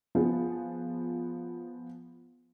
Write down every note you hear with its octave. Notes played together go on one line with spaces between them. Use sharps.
F3 B3 G#4